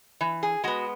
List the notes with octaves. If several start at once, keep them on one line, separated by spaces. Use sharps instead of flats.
E3
G#4
G#3 B3 F#4